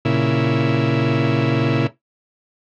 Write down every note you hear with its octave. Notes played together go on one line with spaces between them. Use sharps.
A#2 C#3 E4